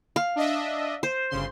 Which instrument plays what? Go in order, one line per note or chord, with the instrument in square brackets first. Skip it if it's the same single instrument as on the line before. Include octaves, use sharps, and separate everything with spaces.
[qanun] F5
[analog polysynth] D4 D#5 E5
[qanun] C5
[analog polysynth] G1 C#3 C6